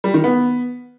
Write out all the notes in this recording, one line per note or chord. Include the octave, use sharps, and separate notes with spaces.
G3
D#3
B3